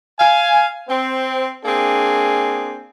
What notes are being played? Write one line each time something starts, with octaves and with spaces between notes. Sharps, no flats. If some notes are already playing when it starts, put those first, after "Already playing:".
F5 G#5
C4
A#3 C4 D4 G#4